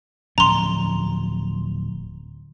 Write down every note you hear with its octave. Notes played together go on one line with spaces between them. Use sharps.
D1 F3 C#4 A#5 C6